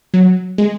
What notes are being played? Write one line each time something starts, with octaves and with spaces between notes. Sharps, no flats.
F#3
G#3